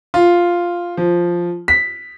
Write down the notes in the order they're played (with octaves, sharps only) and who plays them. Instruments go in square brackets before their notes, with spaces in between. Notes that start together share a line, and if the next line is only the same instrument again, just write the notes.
[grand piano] F4
F3
B6